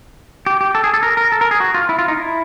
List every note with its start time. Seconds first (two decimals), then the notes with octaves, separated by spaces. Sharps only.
0.46 G4
0.61 G4
0.75 A4
0.84 G#4
0.94 A4
1.03 A#4
1.17 A#4
1.32 A4
1.41 A#4
1.51 G#4
1.60 F#4
1.74 F4
1.89 E4
1.99 F4
2.08 D#4
2.17 E4